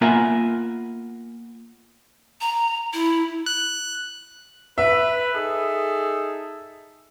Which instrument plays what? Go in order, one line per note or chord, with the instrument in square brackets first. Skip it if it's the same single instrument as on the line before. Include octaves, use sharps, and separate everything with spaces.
[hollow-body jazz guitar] A#3 B3 F4 A#4 E5 G#5
[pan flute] A#5
E4
[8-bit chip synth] F#6
[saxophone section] B4 [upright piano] E5
[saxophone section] D#4 G#4 A4